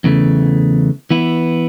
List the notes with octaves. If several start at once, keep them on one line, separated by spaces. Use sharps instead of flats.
E2 C#3 E3 A3
E3 B3 E4